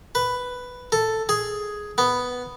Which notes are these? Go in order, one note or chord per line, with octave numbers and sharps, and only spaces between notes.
B4
A4
G#4
B3